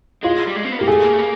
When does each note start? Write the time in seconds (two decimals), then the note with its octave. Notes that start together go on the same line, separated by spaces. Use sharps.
0.23 G#3 F4
0.47 G3
0.56 G#3
0.65 C4
0.72 B3
0.79 A#3 G4
0.87 A3 G#4
1.03 A#3
1.13 A3
1.19 A#3